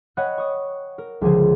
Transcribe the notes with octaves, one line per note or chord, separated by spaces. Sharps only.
C#5 D#5 F#5 G5 B5 F#6
C#6 D#6
A#4
C#2 D3 F3 G#4 C5